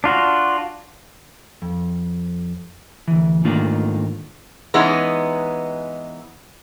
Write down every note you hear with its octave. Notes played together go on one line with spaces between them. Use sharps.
D4 F4 F#4
F2
D2 E3
G#2 D#3 A3 A#3 D4 F4
E3 G#3 B3 C#4 D#4